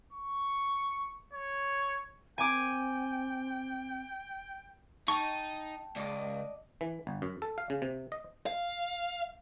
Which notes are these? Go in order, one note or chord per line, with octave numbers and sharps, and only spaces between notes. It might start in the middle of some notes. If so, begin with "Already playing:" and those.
C#6
C#5
C4 G5 G#5 D6
D#4 G5 A5 C#6
C#2 D5 D#5 D6
E3
G1
F#2
A4
F5
C#3
C3
D#5
F5